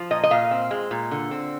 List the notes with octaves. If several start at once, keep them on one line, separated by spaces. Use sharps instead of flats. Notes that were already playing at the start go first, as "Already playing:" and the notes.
Already playing: F3
A#2 D#5
D#5
A#2 F5
C4
G#3
A#2
D3
C4